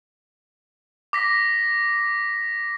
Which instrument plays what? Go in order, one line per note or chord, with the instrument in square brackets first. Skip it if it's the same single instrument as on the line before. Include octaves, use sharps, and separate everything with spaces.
[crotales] D6 A#6 B6